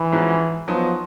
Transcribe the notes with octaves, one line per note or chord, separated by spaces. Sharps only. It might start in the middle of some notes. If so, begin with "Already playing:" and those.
Already playing: E3
G#2 F3 G#3 C#4 F#4
F3 F#3 B3 D#4